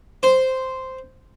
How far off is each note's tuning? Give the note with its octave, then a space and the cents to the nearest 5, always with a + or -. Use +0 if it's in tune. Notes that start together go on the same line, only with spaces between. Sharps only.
C5 -5